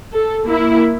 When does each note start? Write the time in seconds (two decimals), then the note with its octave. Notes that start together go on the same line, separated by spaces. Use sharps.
0.14 A4
0.46 A#3 E4